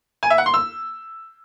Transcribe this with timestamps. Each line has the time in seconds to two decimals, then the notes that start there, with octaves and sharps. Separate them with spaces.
0.23 G#5
0.30 E5
0.38 F#5
0.46 C6
0.54 E6